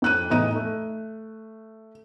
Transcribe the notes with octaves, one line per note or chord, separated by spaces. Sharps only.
F2 F#6 D#7
E2 A2 D#4 D#7
A3